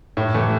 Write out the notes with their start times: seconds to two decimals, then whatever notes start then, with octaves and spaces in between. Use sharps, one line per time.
0.17 A2
0.34 E3 A3